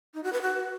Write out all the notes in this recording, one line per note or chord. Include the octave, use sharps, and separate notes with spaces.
D#4
F#4
B4
F#4